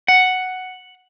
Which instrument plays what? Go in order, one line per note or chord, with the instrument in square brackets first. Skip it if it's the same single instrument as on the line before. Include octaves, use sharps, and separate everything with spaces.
[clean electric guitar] F#5